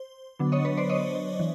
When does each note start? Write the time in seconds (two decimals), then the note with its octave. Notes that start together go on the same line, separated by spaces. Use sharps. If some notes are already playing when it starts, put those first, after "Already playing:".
Already playing: C5
0.39 D3 F#3 B3 D4
0.52 C#5 D#5
0.65 B4 C#5
0.77 C5 D5
0.90 C#5 D#5
1.39 E3